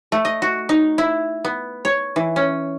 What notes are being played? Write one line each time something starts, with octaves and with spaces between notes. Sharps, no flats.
A3
D#5
F#4
D#4
E4
B3
C#5
E3
C#4